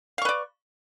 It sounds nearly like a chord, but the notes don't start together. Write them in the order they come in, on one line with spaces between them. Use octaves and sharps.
F5 C#6 B4 D5